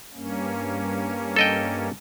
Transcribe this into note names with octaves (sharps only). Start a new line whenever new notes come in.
G2 A#3 C#4
A4 D#5 G5